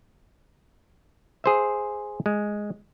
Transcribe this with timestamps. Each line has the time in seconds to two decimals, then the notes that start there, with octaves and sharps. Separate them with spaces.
1.44 G#4 C5 E5
2.26 G#3